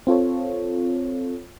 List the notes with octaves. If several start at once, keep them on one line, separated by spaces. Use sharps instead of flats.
C4 F4 A4 C#5